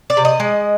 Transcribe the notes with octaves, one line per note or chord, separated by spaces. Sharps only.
D5
C3
D#5
G#3